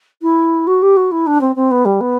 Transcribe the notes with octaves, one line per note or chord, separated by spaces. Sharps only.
E4
F#4
G4
F#4
E4
D4
C4
C4
B3
G3
B3